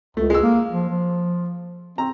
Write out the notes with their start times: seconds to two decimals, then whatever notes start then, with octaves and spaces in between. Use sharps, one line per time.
0.17 C#2 A3
0.30 G#3 E6
0.43 A#3
0.72 F3
0.90 F3
1.98 C4 A#5